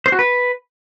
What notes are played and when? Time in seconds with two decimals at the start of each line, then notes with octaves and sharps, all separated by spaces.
0.06 C5
0.12 F#4
0.19 B4